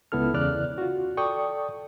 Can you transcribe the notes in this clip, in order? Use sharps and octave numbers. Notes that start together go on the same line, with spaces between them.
C#2 B3 E4 A4 F6
E2 C#3 D5 F6 F#6
F4 F#4
A4 D5 G5 C#6 D#6